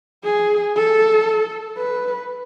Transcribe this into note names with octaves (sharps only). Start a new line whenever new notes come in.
G#4
A4
B4